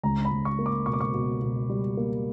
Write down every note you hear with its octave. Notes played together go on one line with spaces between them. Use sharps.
C#2 A#5
B5
C#2
C#6
A#3
D6
B2 C#6
D6
C#6
B2
B2
G3
A#3